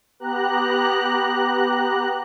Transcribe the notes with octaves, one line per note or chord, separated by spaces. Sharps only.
B3 G4 A#5 F#6